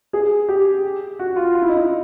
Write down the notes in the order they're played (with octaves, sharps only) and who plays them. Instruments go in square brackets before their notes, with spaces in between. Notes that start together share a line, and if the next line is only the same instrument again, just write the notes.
[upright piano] G#4
G4
F#4
F4
F4
E4
D#4
E4